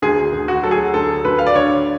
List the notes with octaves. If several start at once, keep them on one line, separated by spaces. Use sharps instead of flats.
D2 G#4
D2
F#4
F#3 A4
G#4
D2 A4
D2 B4
F5
D5
D3 C#5